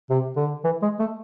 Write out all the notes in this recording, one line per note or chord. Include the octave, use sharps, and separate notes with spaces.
C3
D3
E3
G#3
A3